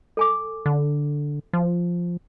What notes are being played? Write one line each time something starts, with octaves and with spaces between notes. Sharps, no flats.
A4 G#5 D6
D3
F3